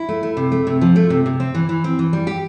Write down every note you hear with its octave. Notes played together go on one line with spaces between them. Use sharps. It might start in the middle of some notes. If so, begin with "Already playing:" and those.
Already playing: E4
A3
A3
C3
A3
C3
F3
A3
C3
C3
C4
E3
E3
C4
E3
G3
G4